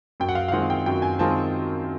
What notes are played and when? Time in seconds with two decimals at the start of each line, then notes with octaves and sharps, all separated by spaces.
0.20 F#2 G5
0.29 F#5
0.35 F5
0.48 F5
0.52 D#3 G#3 C4 F4 F#5
0.70 G5
0.86 F#2 G5
1.02 G#5
1.19 D#3 G#3 C4 F4 A5